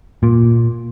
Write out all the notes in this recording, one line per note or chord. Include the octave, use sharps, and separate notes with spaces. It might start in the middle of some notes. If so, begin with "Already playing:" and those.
A#2